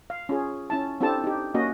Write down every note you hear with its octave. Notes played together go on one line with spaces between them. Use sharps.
F5
C#4 F4 G#4
C#4 E4 A5
C4 D4 E4 G4 A4 A5
D#4 G4
A#3 C#4 F#4 D#5